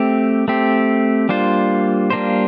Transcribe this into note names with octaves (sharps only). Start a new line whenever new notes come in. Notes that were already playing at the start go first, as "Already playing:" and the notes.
Already playing: A3 C4 G4
A3 C4 G4
G3 A#3 D4 F4 C5
G3 A#3 D4 F4 C5